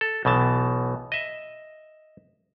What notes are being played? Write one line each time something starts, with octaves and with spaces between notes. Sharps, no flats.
A4
B1 B2 E3 A5
D#5 E5